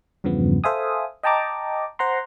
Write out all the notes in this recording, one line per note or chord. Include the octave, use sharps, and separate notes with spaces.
E2 G2 C#3 F3 B3
A4 C5 E5 F5 G#5 D#6
D#5 G5 A5 A#5 D6
C5 F#5 A#5 C6